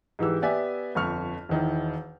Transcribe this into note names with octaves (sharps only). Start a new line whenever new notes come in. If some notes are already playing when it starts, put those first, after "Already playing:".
G#2 E3 G4 E6
B3 G4 D5 E5 G#5
G1 F2 C#6 F6
E1 D#3 E4